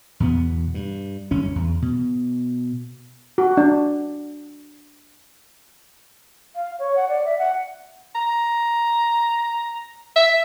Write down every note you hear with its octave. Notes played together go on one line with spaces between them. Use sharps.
E2 B2 B3
G2
G1 F#2 C#4
E2
B2
F#4
D4
F5
C#5
F#5
D5
E5
F#5
A#5
E5